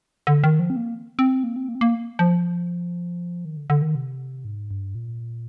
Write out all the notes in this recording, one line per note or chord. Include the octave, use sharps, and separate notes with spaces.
D3
D#3
F3
C4
A#3
C4
A#3
C4
A#3
C4
A#3
F3
D#3
D3
D3
D#3
C3
G#2
G2
A#2